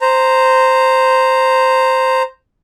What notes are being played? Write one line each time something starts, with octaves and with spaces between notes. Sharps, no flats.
C5 A#5